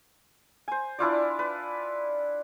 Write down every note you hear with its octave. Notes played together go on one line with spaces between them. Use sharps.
C5 G#5
D4 E4 F4 D5
B4